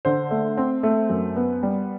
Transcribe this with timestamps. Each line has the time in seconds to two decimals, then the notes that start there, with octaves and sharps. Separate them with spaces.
0.05 D3 C5
0.31 A3
0.57 C4
0.83 A3
1.10 F#2
1.36 B3
1.63 G3